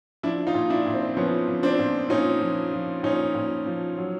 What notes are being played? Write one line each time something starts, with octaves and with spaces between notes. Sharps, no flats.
F3 D4 E4
D#4 F4
A#2
D4 E4
A#2
C4
F3 B3 C#4
F3
C4 D4
A#2
A#2 C#4 D#4
F3
F3
A#2 C#4 D#4
A#2
F3
F#3